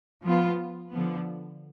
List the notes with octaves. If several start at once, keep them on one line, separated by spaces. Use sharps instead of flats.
F3 B3 F4
D3 F3 B3